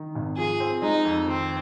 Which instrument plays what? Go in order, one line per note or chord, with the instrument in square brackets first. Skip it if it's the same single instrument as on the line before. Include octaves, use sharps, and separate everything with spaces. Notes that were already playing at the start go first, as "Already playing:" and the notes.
Already playing: [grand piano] D#3
G#1
[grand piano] F3 [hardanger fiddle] G#4
[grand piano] C4
[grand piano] G#3 [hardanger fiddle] D#4
[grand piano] F2
[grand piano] D#3 [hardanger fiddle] C4